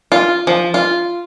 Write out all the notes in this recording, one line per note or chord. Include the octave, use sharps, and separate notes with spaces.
F4
F3
F4